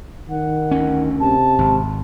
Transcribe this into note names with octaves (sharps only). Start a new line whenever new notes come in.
D#3 F#5
D2 C#4
C3 A5
G#1